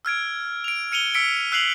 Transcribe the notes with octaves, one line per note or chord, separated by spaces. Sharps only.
E6 F6 G#6 D7
D7 F7
F6 C#7 D#7 F7 G7
E6 B6 C#7 D7
E6 F#6 C7 F7 F#7